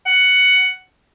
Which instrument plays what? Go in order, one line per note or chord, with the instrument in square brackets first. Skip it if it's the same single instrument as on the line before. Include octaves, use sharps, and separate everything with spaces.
[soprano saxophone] F#5